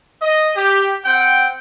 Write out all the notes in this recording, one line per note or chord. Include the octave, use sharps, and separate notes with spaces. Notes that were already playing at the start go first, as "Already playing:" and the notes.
D#5
G4
C4 F#5 G5